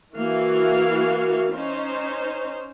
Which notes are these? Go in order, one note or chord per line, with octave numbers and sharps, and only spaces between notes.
E3 A#3 F#4 F5
C#4 D#4 C5